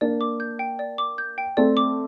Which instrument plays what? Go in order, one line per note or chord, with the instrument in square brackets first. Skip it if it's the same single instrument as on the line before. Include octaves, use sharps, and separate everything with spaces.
[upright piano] A#3 D4 [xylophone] D5
[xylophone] D6
G6
G5
D5
D6
G6
G5
[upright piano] A3 C4 [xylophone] D5
[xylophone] D6